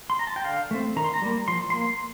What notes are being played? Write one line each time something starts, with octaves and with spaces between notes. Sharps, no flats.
C6
A#5
A5
G5
D3 F5
A3 C4
D#3 A#5
C6
A#5
G3 A#3
F3 C6
A#3 C6